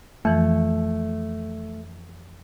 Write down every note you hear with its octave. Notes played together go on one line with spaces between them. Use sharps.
F2 E3 F3 A3